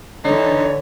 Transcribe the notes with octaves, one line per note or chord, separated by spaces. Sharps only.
D3 E3 D#4 C#5